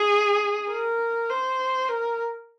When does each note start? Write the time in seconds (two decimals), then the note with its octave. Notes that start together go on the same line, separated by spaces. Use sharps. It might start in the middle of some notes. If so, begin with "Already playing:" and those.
Already playing: G#4
0.69 A#4
1.29 C5
1.89 A#4